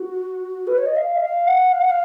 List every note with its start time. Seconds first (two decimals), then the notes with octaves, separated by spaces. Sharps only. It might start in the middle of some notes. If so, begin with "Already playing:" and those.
Already playing: F#4
0.67 B4
0.77 C#5
0.86 D#5
0.96 F5
1.15 D#5
1.20 F5
1.46 F#5
1.72 F5
1.80 F#5
1.89 F5